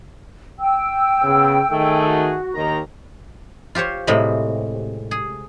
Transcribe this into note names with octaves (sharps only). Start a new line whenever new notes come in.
G5 E6
C#3 B3
D#3 A3 G#4
F#4
D#2 D#3 A#5
F4 G4 C5 C#5
A2 C3 G3 G#3
G#4